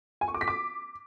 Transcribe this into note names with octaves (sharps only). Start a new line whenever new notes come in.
G#5
C#6
D6
B6
D6